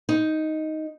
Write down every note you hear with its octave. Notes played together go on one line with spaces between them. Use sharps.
D#4